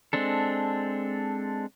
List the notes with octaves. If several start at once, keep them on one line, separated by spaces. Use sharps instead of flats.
G#3 C4 D4 A4